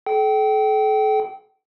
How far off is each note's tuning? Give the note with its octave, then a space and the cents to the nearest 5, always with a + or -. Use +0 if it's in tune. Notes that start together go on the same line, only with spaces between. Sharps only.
A4 -40 G5 -25